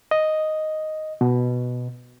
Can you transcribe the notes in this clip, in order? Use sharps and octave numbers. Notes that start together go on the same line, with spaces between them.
D#5
B2